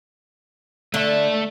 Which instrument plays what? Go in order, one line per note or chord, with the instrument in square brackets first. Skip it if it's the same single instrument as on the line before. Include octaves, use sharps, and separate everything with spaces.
[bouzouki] D3 [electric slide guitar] A3 E5